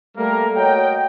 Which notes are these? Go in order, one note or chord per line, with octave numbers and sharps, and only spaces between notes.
G3 A3 A#3 A#4
F#4 C#5 D#5 G5